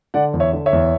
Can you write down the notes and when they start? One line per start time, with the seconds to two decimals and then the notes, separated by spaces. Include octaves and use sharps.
0.14 D3 D5 F#5
0.34 E2
0.40 C#5 E5
0.53 D3
0.66 C#5 E5
0.73 E2